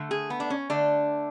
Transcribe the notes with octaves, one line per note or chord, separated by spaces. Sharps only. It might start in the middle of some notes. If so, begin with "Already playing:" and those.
Already playing: D3 A3
G#4
B3
D4
C#4
D3 A3 D4